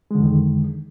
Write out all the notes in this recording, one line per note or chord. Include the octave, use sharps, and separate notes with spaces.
F2 D3 D#3 G#3